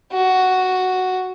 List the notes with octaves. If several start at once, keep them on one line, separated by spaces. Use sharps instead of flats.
F#4